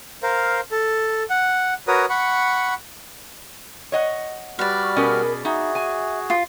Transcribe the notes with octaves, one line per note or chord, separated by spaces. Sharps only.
A#4 C5 F5
A4
F#5
F#4 A#4 B4 C#5 D#6
F#5 B5 C#6
C#5 D#5 F#5
G3 F#4 B4 D5 C#6 F6
B2 C#4 G#4 A#4
D#4 F#4 G#4 E5
G#5
F4